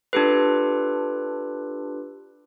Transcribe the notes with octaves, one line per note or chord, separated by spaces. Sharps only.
D4 F4 G4 A4 B4